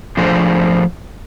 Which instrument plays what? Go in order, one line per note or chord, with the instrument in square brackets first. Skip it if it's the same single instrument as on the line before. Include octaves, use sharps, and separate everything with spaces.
[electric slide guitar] F3 A3 D4 G#4 C5